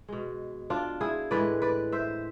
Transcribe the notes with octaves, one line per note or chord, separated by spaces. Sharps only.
B2 G#3
D4 F4
E4 G#4
A2 E3 G#3 B4 D5
B4 D5
C5 E5